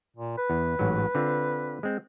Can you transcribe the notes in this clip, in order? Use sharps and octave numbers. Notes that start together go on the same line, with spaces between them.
A#2
B4
E2
A1 G#2 F#3
D3 C4 F4
G#3 C4